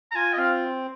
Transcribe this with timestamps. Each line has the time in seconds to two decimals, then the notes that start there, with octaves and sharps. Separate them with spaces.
0.11 A#5
0.15 F4 G#5
0.33 D#5
0.37 C4 F5